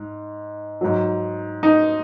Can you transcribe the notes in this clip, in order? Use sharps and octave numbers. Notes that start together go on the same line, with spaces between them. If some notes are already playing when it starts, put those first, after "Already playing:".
Already playing: G#2
G#2 F#3
D#4